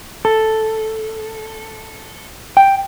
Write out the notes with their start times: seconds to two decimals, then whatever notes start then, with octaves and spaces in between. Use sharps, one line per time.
0.25 A4
2.57 G5